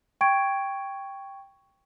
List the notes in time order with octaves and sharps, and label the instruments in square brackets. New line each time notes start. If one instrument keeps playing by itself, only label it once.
[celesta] G5 C#6 G#6 D7